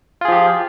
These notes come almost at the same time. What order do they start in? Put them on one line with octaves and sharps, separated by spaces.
F4 G#4 F3 G4